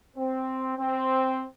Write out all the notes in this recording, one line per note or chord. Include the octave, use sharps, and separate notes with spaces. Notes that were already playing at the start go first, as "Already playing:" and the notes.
C4
C4